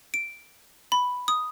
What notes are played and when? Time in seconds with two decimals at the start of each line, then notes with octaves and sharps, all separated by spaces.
0.14 D7
0.92 B5
1.28 D#6